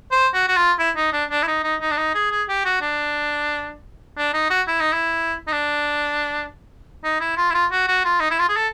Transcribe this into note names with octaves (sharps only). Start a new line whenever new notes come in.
C5
F#4
F#4
F4
E4
D#4
D4
D4
E4
D#4
D#4
D#4
D4
D#4
G#4
G#4
G4
F#4
D4
D4
D#4
F#4
E4
D#4
E4
D#4
D4
D#4
E4
F4
E4
F4
F#4
F#4
F4
D#4
E4
F4
G#4
A4